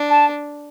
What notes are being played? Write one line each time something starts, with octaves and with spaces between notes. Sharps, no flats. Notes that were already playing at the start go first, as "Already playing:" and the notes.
Already playing: D4
A5